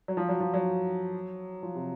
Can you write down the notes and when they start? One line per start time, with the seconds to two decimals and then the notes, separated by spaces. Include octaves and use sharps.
0.08 F#3
0.17 F3
0.29 F#3
0.40 F3
0.54 F#3
1.63 F3
1.75 C3